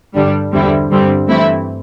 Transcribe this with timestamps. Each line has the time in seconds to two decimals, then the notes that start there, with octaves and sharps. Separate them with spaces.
0.15 G2 D3 G3 D4
0.52 E2 D3 G3 C4 E4
0.91 G2 D3 G3 C4
1.27 G2 E3 A3 C4 E4